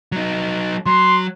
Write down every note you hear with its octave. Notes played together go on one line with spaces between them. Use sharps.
F#3 D#4
F#3 C6